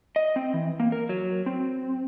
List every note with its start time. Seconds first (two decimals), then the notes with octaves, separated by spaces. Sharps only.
0.16 D#5
0.36 C4
0.54 E3
0.80 A#3
0.92 A#4
1.09 F#3
1.46 C4